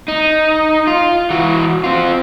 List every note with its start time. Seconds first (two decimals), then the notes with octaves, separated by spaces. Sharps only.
0.08 D#4
0.87 F4
1.30 E3 F#4
1.84 C4 F4